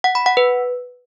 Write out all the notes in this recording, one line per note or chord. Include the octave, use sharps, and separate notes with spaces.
F#5
B5
F#5
B4